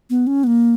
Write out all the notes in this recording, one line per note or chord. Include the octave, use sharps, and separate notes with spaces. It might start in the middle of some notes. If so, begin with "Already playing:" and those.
B3
C#4
B3
A#3